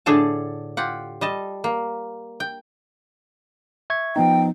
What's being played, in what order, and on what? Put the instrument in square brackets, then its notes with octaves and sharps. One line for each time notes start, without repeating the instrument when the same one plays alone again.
[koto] A2 D3 D4 G#4 A4 A5
F4 G4 F#5
G3 D#5 A5
A#3
G5
[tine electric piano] E5 C#6 G#6
[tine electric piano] F3 B3 D#4 [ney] G5